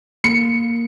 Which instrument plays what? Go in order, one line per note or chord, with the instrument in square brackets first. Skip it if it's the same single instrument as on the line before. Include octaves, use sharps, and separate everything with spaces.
[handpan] A#3 [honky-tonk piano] C#7